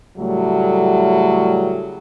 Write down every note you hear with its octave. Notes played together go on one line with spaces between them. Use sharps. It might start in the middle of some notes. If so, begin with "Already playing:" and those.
A2 C#3 F#3 G3 A3